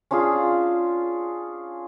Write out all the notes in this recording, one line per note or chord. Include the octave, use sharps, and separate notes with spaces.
C#4 D4 F4 G#4